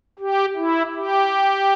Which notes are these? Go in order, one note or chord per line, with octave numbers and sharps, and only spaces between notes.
G4
E4
G4